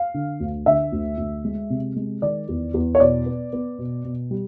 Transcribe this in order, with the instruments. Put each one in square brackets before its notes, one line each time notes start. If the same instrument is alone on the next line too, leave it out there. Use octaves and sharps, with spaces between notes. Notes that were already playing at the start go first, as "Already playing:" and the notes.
Already playing: [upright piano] F5
D3
D2
D3 E5
D2
D2
G#3
C3
G#3
D#3 D5
E2
E2
C#5
B2 D5
B3
B3
B2
B2
G3